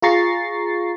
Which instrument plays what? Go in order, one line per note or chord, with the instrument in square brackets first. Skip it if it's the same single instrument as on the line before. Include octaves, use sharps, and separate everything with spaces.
[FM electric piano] F4 G#4 A#5 C#6 A6 C7